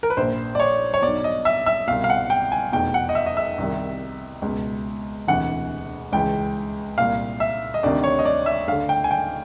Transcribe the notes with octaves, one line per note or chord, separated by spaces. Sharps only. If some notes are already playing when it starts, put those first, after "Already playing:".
A#4
B4
A#1 A#2 C5
D5
C#5
C#5
B1 B2 D5
D#5
E5
E5
C2 B2 F5
F5
F#5
G5
G#5
F1 E2 B2 G5
F#5
D#5
E5
D#5
E5
C2 C3 D#3
C#2 B2
E1 D2 C3 E3 F#5
C#2 C#3 E3 G5
C2 A#2 F5
E5
D#5
D2 C3 D#3 D5
C#5
D#5
D5
E5
D2 D3 F5
G5
G#5
G5